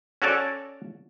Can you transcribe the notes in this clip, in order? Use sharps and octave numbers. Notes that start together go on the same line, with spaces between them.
C#4 F#4 A4 C#5 D5